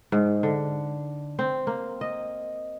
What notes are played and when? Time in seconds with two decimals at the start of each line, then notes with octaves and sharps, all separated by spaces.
0.12 G#2
0.43 D3
1.39 C4
1.67 A#3
2.01 D#5